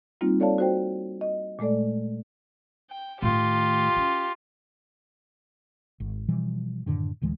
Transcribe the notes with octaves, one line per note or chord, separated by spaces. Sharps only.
G3 A#3 C4 D#4 F4
A4 C#5 D5 F5 A5
F#4 C5 G5
D#5
A#2 G#3 A3 A4 D5
G5
A2 D#3 F4 G4
C#4
G#1
B2 E3 F3 G3
F#2 A2 D3 D#3
D#1 D2 E3 G#3